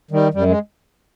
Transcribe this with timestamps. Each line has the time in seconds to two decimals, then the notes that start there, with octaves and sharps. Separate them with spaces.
0.11 D#3 G3
0.34 F#2 G3
0.48 G#3